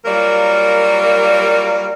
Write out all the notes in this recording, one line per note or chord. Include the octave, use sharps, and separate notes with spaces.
F#3 G3 A#3 F4 A#4